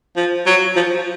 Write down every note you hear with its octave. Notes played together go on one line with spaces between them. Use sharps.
F3
F#3
F3